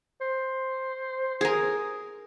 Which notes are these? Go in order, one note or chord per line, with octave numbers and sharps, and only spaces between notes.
C5
G#4 A#4